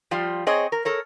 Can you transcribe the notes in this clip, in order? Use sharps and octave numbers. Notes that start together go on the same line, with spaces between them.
F3 G3 F4
C4 G#4 C#5 D#5
A#4
A4 A#4 C#5